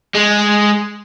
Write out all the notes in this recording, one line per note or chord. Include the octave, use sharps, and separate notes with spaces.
G#3